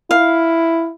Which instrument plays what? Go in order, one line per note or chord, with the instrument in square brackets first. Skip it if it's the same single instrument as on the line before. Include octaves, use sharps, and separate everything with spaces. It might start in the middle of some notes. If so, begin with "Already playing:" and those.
[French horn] E4 [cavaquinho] F5